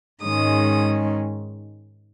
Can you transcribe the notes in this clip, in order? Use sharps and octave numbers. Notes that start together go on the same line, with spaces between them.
G#2 D#3 G#3 C#4 D#6